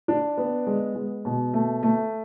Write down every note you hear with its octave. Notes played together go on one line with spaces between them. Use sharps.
D4
B3
G#3
G#3
B2
A3
A3